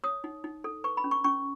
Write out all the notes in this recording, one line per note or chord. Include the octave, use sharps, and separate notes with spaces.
C#5 D#6
D#4
D#4
A4
B4 C#6
B5
C#4
C#6
C#4 C#6